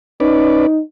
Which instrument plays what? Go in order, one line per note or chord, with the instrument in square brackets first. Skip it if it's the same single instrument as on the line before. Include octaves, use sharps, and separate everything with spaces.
[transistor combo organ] C#4 B4 D5 [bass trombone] D#4